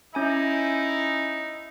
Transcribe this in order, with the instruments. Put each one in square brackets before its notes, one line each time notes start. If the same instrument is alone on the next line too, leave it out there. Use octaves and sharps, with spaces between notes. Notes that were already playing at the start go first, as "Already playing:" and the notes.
[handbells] C#4 G#5 [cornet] D#4 [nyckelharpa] E4